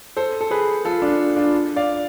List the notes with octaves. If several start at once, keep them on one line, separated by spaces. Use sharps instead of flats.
A4 C5
A4
G#4 B4
F4 A4
D4 F4
D4 F4
D5 F5